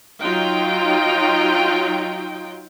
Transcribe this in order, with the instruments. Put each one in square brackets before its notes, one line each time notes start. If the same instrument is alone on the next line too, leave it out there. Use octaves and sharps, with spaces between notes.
[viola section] F#3 D#4 F4 G5